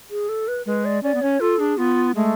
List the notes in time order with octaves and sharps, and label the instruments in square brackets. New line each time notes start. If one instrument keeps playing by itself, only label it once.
[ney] G#4
A4
B4
[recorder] G#3 [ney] B4
[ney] D5
[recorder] C#4 [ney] D5
[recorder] B3
[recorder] C#4 [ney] C#5
[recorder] F4 [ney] A4
[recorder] D4 [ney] G#4
[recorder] B3 [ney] F4
[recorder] G#3 [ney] A3